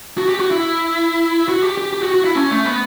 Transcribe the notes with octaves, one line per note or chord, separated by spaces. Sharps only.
F#4
G4
F#4
E4
F#4
G4
G4
G4
F#4
F#4
E4
C#4
A3
B3